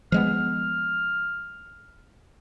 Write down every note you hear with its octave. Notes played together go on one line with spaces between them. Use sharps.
F3 G#3 B3 F6